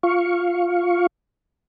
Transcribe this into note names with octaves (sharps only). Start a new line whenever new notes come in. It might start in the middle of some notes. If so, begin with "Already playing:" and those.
F4 F5 C#6